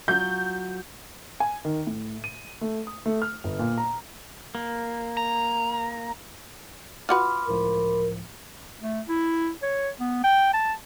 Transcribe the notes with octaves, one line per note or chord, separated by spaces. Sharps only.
F#3 F4 G6
G#5
D#3
A2
D#7
A3
D#6
A3
F6
G1
A#2
A#5
A#3
A#5
F4 F#4 B4 B5 C6 D6 F6
C#2 A2 F3 A#4
A3
E4
C#5
B3
G5
A5